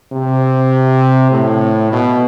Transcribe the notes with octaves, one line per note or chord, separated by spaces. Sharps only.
C3
A2
B2